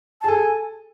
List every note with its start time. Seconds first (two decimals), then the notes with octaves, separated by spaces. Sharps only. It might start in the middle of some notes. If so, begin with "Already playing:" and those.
0.21 A5
0.24 G#4
0.28 A4 G#5